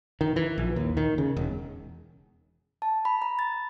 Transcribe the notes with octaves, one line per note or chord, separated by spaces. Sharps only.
D#3
E3
A#1
D#2
D#3
C#3
E1
A5
B5
A#5
A6